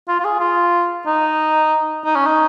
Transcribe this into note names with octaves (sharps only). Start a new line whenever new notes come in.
F4
F4
G#4
F4
D#4
D#4
C#4
D#4